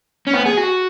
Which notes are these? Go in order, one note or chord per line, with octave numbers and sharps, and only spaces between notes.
C#4
B3
G#4
F#4